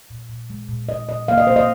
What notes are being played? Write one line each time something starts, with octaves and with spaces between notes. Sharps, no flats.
A#2
A#2
G#3
A#2
A#2 D#5
A#2 D#5
A#3 F5
D#5
A#2 C5
D#5